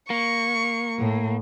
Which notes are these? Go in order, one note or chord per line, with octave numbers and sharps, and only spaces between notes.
A#3 C#6
A2